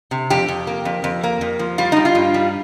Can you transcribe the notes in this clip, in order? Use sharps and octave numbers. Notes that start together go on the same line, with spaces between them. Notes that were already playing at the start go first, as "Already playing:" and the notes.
C3
F2 G4
F2
A#3
F2
F2
A#3
F2
F3
G3 F4
G3 D#4
F4
G2
G3